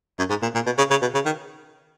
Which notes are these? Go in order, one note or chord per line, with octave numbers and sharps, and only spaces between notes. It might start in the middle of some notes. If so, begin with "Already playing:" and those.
F#2
G#2
A#2
A#2
B2
C#3
C#3
B2
C#3
D#3